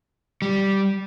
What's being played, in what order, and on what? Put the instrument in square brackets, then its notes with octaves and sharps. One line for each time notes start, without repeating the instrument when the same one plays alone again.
[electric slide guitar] G3